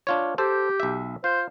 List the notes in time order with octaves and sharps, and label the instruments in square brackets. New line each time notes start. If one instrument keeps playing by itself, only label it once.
[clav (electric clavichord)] D4 F4 C#5
[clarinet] G4 [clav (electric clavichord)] A4 C5
[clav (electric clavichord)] B1 E5
[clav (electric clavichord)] F4 [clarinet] C5